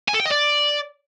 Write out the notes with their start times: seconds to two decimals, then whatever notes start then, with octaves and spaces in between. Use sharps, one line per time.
0.09 G#5
0.14 A4
0.20 G5
0.26 D#5
0.31 D5